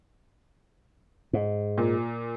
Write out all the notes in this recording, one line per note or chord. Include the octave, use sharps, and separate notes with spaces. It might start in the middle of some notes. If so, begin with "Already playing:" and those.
G#2
A#2